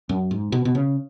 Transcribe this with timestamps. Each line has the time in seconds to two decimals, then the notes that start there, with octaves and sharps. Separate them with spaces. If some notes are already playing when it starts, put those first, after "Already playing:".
0.09 F#2
0.31 G#2
0.52 B2
0.65 B2
0.75 C#3